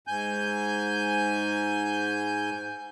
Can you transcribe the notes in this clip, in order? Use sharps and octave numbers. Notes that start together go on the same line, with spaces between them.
G#2 G#5 G6